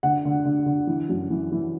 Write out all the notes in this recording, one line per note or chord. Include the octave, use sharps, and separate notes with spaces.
D3 F#5
D3
D3
D3
E3
F#2
E3
E3